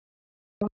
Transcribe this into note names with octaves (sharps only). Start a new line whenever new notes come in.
G#3